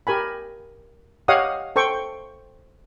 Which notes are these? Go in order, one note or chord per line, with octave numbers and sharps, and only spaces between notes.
G4 A#4 G#5 B5
G4 C#5 D#5 F5 F#5 D#6
A4 C5 G5 C#6